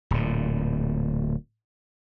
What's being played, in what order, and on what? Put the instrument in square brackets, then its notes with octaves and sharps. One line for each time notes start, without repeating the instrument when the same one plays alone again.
[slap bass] D1 A#2